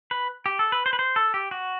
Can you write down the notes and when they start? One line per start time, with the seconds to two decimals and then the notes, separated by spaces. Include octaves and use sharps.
0.11 B4
0.46 G4
0.59 A4
0.72 B4
0.86 C5
0.93 B4
0.99 C5
1.16 A4
1.34 G4
1.51 F#4